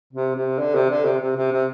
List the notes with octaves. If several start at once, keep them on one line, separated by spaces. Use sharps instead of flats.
C3
C3
D3
C3
D3
C3
C3
C3
C3